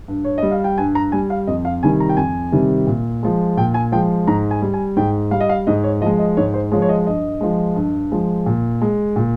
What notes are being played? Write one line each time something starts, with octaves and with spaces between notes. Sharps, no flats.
G2
C#5
G3 D#5
F5
G5
G2 G#5
A#5
G3 G#5
F5
F2 D#5
F5
C3 D#3 G3 G#5
A#5
G5
F2 G#5
C3 D#3 G3
A#2
F3 G#3
A#2 G5
G#5
F3 G#3 G5
G#2 A#5
G#5
G3
G#5
G#2 G5
G3 F5
D#5
F5
G#2 D#5
C#5
F3 D#5
G#3
D#5
G#2 C#5
C5
F3 G#3 C#5
C#5
D#5
G2 D#5
F3 G#3
G2
F3 G#3
A#2
G#3
A#2